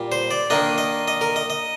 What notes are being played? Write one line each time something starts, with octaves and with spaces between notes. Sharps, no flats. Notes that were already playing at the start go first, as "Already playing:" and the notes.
Already playing: A#2 G3
C5
D5
D#3 A#3 D4 D#5
D#5
D#5
A#4
D#5
D#5